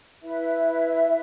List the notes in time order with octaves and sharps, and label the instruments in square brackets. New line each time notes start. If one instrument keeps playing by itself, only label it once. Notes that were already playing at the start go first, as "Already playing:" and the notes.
[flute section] E4 B4 E5